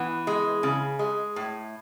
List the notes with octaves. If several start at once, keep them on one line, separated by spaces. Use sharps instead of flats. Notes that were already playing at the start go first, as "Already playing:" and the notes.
Already playing: E3 B3
G#3
C#3
G#3
A2